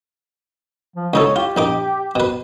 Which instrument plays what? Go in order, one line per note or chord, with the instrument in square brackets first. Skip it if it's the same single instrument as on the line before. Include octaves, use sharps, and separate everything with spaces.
[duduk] F3
[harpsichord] C#2 D#4 A4 [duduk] C#5
[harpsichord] F4 [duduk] G4
[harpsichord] A#1 D#4 D6
B2 B4